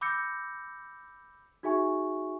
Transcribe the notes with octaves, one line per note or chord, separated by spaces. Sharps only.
B5 D6 E6 G6 A#6 C#7
D#4 F#4 G#4 E5 G#5 C#6